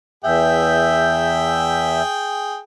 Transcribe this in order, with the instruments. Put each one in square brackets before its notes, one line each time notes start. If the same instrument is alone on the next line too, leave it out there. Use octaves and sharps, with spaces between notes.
[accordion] E2 E5 G6 [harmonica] G#4 G5